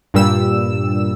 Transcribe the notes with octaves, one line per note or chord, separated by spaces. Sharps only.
G2 A#2 G3 E6